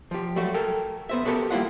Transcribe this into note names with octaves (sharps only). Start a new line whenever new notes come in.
F3 G4
F#3 G3 A3 F#4
A4 A#4 G5
B3 C5 E5
B3 F#4 G4 A4 A#4
G3 A#3 E4 F4 F#5